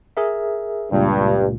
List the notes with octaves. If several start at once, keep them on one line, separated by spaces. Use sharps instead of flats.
G#4 A#4 E5
C#2 G2 A#2